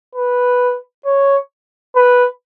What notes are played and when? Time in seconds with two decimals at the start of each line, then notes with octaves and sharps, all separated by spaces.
0.15 B4
1.06 C#5
1.96 B4